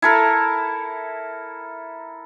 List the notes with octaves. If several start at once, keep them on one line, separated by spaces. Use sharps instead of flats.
E4 A4 A#4